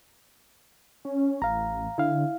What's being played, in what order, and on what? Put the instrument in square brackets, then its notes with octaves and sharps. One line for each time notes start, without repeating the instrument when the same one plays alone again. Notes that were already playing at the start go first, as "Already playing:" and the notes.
[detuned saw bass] C#4
[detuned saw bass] A1 [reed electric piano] F5 A#5
[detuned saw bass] D3 [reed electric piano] E4 F5